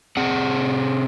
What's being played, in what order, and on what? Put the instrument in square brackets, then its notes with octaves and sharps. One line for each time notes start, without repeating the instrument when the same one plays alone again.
[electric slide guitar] C3 C4 G#4 F#5